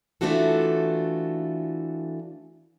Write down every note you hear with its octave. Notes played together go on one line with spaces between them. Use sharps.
E3 A3 D4 F4 F#4 A4